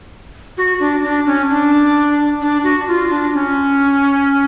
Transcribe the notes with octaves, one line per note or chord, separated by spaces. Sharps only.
F#4
D4
D4
C#4
D4
D4
F#4
F4
D4
C#4